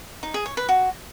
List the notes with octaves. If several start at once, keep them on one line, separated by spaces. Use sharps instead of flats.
D#4
G#4
C#5
B4
F#4